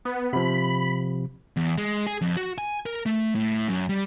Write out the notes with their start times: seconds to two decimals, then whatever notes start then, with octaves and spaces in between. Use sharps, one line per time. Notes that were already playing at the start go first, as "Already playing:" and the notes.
0.05 B3
0.33 C3 F3 B5
1.57 E2
1.78 G#3
2.07 G#4
2.21 F2
2.37 F#4
2.58 G#5
2.86 A#4
3.06 A3
3.35 A2
3.68 F#2
3.89 G3